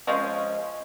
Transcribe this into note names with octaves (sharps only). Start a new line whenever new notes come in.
F3 G#3 C#4